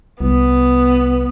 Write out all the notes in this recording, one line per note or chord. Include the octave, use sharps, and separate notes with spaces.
C2 B3